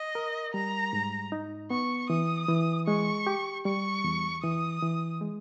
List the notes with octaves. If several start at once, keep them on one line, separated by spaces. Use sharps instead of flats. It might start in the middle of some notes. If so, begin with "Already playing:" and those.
Already playing: D#5
A#4
G3 A#5
G#2
D#4
B3 C#6
E3 D#6
E3
G#3 C#6
G4
G3 C#6
E2
E3 D#6
E3
G#3